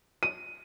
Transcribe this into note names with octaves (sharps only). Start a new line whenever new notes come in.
D#7